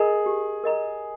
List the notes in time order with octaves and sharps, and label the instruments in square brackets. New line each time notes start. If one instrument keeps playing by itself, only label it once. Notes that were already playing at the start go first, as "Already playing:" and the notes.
Already playing: [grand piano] G#4 [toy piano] A#4 D#5 A#5
[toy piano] G4
A#4 D#5 A#5